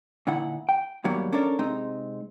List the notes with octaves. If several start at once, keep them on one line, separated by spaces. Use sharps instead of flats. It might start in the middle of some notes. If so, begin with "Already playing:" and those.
A#2 D3 D#4 E4 F#5
G5
D#2 G#2 F#3 G3 A#3 B3
C#4 D4 A4 A#4 C#5 D5
C3 G#3 C4 D#4